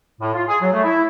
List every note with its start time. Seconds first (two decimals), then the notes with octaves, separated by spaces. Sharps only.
0.21 A2
0.33 F4
0.47 G#4
0.61 F#3
0.72 A3
0.84 E4